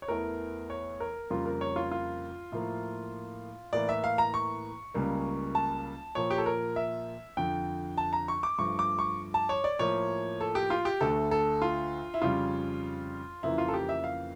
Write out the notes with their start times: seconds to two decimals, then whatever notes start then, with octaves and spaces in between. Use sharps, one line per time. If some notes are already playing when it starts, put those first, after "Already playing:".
0.02 C#5
0.08 E2 E3 A3 A#4
0.70 C#5
1.00 A#4
1.30 F2 C#3 G3 A#3 F4
1.46 A#4
1.61 C#5
1.76 F4
1.91 F4
2.52 A2 F3 A#3
3.73 A2 E3 A#3 D5
3.89 E5
4.04 F5
4.18 A#5
4.34 C#6
4.94 C#2 C#3 G3 A#3
5.55 A5
6.15 A#2 F3 A#3 C#5
6.31 G4
6.38 A4
6.46 A#4
6.76 E5
7.37 F2 D3 F3 G5
7.98 A5
8.13 A#5
8.28 C#6
8.43 D6
8.58 G2 F3 A3 C#6
8.79 D6
8.99 C#6
9.34 A5
9.49 C#5
9.64 D5
9.79 A2 F3 A#3 C#5
10.41 A4
10.55 G4
10.70 F4
10.85 G4
11.01 D2 D3 A3 A4
11.31 A4
11.62 F4
12.14 E4
12.22 F2 C#3 G3 F4
13.43 F2 C#3 E3 A#3 E4
13.58 F4
13.68 A4
13.74 G4
13.89 E5
14.04 F5